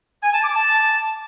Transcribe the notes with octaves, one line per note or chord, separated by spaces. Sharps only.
G#5
A5
D6
A5